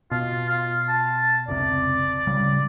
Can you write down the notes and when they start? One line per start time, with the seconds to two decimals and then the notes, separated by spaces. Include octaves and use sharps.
0.11 B2 F4
0.49 F4
0.89 A5
1.48 F1 C#2 C3 D5
2.27 D1 C#3 G3